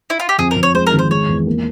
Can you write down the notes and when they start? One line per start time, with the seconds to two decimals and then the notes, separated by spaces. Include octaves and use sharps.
0.10 E4
0.20 F4
0.29 G4
0.38 F2 G#4
0.51 A#4
0.56 F2
0.63 C#5
0.74 G#3 C5
0.87 A#4
0.93 G#1
0.99 C5
1.10 G#3 C#5
1.29 E2
1.47 A#3